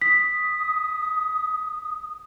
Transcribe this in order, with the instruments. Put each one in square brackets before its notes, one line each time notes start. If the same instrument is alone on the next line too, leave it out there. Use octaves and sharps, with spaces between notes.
[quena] D#6 [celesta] B6